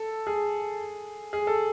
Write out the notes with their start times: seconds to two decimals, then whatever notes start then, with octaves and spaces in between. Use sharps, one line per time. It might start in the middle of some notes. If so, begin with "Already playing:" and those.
Already playing: A4
0.27 G#4
1.33 G#4
1.47 A4